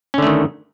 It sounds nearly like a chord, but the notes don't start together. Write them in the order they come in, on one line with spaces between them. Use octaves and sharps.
C#4 D3 A3 D#3